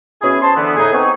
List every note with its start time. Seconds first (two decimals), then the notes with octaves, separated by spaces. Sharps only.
0.22 B2 C#4 E4 G#4
0.42 C#4 C5 A5 C6
0.56 D3 E3 B3
0.76 A2 D#4 G#4
0.93 B3 C4 D#4 G#4 C#5